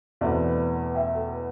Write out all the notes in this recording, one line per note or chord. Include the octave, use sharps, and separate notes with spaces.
E2 B2 A3 C4 B4 D5
B4
B4
E5 G5
A4
B4